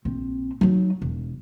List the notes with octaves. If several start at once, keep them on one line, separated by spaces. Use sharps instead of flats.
A#1 C4
F#3 D#4
E1